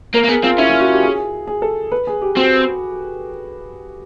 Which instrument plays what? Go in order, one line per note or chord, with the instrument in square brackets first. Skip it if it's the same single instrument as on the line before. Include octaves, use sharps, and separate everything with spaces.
[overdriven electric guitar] A#3 [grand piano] A#4
[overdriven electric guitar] A#3
[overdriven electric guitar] B3 [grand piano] G#4
[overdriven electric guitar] C4 [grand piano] F4
[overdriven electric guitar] C#4 [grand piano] E4
[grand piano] F4
F#4
G4
G#4
G#4
A4
B4
G#4
G4
[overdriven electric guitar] C4 [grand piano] F#4